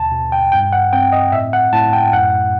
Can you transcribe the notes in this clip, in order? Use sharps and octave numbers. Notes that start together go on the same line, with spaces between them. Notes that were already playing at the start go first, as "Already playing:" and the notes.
Already playing: D#2 B2 A5
B2
G5
G2 G5
F#5
C4 G5
D#5
A2 E5
F#5
A2 A5
G5
F#2 F#5